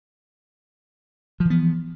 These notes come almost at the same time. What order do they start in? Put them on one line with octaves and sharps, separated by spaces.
F3 E3 B3